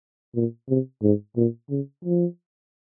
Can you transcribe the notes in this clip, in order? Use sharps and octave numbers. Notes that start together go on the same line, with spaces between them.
A#2
C3
G#2
A#2
C#3
F3